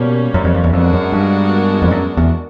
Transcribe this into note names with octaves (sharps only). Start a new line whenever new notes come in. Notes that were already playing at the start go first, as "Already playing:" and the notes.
Already playing: B2 G3 A#3 C#4
F#2
F2
F2
E2
F2 G#3 B3 D4 F#4 A#4
F#2
G2
F2
F#2
E2